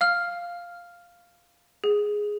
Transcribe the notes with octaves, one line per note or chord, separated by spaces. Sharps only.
F5 F6
G#4